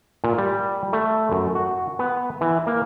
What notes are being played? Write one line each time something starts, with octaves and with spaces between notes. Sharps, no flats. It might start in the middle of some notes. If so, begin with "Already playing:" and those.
A#2
G3
A3
F#2
F#4
B3
E3
A#3